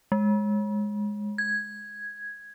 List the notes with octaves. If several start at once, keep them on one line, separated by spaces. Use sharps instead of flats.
G#3
G#6